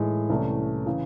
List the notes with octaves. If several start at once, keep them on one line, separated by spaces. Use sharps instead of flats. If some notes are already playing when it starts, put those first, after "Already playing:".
Already playing: A2 E3 G#3 D#4 G#4
C2 C3 E3 A3 C#4
C#3 E3